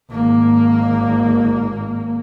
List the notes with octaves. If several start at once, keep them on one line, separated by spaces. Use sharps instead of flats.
G#1 A#3